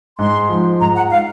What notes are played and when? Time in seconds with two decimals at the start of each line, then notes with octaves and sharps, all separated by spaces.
0.18 G#2 C6
0.49 F3
0.80 G#2 A#5
0.96 F#5
1.10 F5